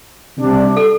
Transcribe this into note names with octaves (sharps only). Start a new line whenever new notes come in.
C3 G3 D4
A4